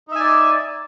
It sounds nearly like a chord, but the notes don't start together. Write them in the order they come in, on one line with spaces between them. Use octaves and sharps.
D#4 E5 G#5 D5